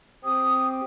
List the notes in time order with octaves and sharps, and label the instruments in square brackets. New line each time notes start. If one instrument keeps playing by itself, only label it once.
[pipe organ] C4 G4 [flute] D#6